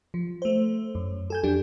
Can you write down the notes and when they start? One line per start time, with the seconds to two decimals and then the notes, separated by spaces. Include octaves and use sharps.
0.14 F3
0.42 A3 C5
0.95 F#2
1.30 A4 G#5 G6
1.44 F2 F#3 D4 G4